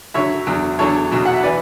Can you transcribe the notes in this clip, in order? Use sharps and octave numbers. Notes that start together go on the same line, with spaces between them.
F#2 D3 F#3 C#5 E5
E2 D3 F#3
E2 D3 F#3 A4 C#5
E2 B2 F#3
F#5
E5
E3 B4 D5